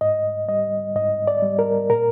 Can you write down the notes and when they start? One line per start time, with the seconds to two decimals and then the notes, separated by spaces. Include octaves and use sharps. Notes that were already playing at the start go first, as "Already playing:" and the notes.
0.01 G#2 D#5
0.48 G3 D#5
0.96 G#2 D#5
1.27 D5
1.42 G3
1.59 A#4
1.89 A#2 A#4